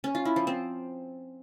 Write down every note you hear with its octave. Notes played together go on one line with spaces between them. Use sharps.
C#4
F4
E4
F3
C4